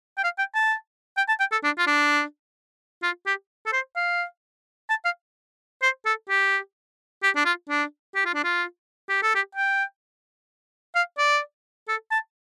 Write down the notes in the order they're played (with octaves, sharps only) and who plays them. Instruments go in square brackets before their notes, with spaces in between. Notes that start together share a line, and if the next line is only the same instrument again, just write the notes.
[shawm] G5
F5
G5
A5
G5
A5
G5
A4
D4
F4
D4
F4
G4
A4
C5
F5
A5
F5
C5
A4
G4
G4
D4
F4
D4
G4
F4
D4
F4
G4
A4
G4
G5
F5
D5
A4
A5